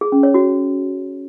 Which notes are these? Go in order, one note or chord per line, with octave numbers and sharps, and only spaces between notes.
G#4
C#4
C#5
F#4